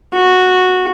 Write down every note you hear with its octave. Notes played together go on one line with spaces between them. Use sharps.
F#4